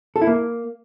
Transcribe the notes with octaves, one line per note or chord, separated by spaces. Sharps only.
A4
E4
A#3